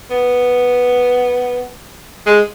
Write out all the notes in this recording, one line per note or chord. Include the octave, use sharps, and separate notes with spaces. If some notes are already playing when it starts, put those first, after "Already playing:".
B3
G#3